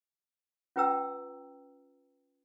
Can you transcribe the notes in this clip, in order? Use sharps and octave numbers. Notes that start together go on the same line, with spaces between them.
C#4 F4 B4 G5 A#5 E6